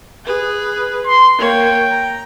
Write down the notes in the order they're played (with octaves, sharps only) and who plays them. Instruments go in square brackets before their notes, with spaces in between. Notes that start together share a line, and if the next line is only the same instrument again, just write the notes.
[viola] G#4 B4
[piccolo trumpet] C6
[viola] A#3 C#5 [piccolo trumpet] G5
[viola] A#5